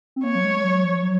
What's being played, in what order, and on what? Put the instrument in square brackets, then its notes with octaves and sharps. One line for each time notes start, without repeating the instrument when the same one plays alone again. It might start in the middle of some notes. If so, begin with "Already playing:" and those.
[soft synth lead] C4
[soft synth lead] A#3 [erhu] C#5
[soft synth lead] F#3
G#3
F#3
F3
F#3